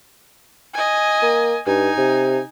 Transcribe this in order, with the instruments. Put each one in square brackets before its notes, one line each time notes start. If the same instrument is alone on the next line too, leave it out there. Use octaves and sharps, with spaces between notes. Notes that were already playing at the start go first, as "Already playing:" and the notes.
[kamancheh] D#5 G#5
[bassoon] A#3
[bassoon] G2 [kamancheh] D#4 G#5
[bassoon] C3